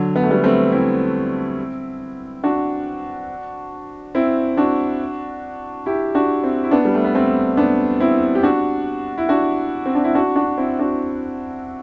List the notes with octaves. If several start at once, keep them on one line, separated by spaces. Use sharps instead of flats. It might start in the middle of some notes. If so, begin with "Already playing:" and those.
Already playing: D3 F#3
B3
A3
G3 B3
A3 C4
C4 E4
D4 F#4
C4 E4
D4 F#4
E4 G4
D4 F#4
C4 E4
E4
B3 D4
G3
A3
B3
A3 C4
B3 D4
C4 E4
G4
D4 F#4
E4
D4 F#4
C4
D4
E4
D4 F#4
D4 F#4
C4 E4
D4 F#4